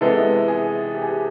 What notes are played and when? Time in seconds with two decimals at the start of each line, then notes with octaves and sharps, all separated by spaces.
0.01 C3 E3 G#3 B3 A4
0.48 G#4
0.94 G4
1.02 G#4
1.09 G4